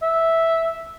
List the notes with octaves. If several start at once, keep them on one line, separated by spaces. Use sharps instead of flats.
E5